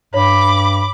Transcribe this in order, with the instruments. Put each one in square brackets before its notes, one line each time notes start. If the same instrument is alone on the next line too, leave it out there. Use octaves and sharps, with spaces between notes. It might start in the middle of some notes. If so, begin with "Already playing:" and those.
[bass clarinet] G2 [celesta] C#5 [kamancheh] B5 D6